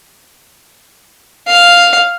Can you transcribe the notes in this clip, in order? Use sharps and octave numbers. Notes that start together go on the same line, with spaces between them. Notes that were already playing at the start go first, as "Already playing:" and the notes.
F5